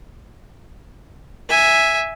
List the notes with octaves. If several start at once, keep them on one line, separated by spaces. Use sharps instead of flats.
E5 G#5